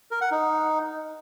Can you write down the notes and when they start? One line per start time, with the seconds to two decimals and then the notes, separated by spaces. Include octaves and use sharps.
0.11 A#4
0.21 F#5
0.31 D#4